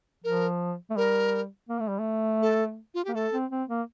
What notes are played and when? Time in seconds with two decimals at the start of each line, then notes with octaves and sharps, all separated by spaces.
0.24 F3 A#4
0.91 A3
0.97 G3 A#4
1.69 A#3
1.80 A3
1.89 G3
1.99 A3
2.42 A4
2.94 F4
3.05 A#3 G4
3.14 A3 A4
3.33 C4
3.51 C4
3.69 A#3